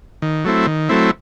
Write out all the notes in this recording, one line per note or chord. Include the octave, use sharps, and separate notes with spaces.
D#3
F#3 A3 C4 E4
D#3
F#3 A3 C4 E4